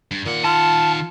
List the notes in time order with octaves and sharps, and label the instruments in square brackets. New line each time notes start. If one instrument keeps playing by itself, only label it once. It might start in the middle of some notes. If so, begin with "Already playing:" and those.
[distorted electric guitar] G2
[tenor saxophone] A#2 [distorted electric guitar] D#3 F#5
[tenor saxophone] F4 [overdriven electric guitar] A5